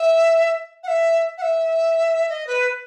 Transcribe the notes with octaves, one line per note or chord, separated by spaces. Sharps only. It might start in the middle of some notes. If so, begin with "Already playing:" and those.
Already playing: E5
F#5
E5
F#5
E5
D#5
B4